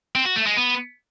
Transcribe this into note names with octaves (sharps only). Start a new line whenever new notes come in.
C4
F#4
A3
G#3
B3